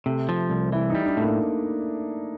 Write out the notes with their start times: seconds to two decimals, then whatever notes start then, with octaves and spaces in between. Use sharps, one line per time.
0.06 C3 A3
0.29 F3
0.50 C2
0.72 E3 E4
0.90 D#4
0.95 G3
1.06 D4
1.17 A2 A3
1.23 A#3